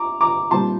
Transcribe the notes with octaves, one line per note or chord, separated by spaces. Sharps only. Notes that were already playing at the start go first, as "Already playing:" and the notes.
Already playing: A#5 D6
A#5 D6
A#2 G3 C4 D#4 A5 C6